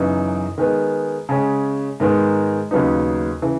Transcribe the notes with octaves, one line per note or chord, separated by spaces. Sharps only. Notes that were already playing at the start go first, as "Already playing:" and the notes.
Already playing: F#2 C#3 E3 B3 D#4
D#3 G#3 B3
C#3 G#3 C#4
G#2 D#3 G#3 B3
D#2 C#3 F#3 B3 D#4
C#3 E3